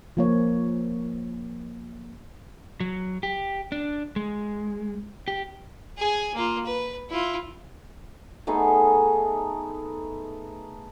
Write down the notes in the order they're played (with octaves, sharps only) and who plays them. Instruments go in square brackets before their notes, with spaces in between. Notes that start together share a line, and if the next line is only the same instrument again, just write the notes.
[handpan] F3 A#3 C#5
[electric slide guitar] F#3
G4
D4
G#3
G4
[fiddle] G#4 G#5
A#3 F4
B4
E4 F4
[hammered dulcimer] A3 B3 D#4 G#4